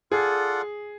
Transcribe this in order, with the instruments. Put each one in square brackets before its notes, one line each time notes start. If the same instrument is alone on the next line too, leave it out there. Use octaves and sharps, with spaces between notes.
[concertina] F4 A4 D5 F#5 [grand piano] G#4